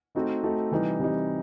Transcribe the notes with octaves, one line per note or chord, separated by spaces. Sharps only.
A3 C4 D#4 F#4 A4
A3 C4 D#4 F#4 A4
C3 E3 G3 D#4
C3 E3 G3 D#4